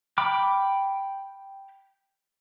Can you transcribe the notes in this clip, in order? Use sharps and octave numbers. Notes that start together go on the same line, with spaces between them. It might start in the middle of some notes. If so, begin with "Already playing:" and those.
G5 B5 D6 F6